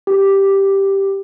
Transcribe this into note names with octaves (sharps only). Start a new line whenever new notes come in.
G4